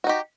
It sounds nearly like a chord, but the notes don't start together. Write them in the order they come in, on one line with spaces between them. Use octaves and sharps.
F#4 D#4 G4